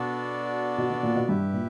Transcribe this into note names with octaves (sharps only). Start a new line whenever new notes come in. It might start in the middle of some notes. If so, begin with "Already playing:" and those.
Already playing: B2 B3 D4 F#4 A4 D5
B2
B2
A#2
B2
G2 E4 G4 B4 E5
A#2